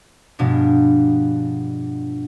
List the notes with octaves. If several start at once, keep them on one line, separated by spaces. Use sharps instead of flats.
G2 B2 F3 G#3 B3 D4